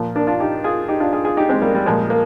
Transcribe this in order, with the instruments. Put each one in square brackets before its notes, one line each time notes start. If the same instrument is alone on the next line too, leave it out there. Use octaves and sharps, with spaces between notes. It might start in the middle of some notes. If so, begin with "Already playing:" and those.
Already playing: [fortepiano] A#2 F3
A#3 D4
D4 F4
D#4 G4
F4 G#4
D#4 G4
D4 F4
F4 G#4
F4 G#4
D#4 G4
G#3 C4
G3 A#3
G3
A#2 F3 G#3
A#3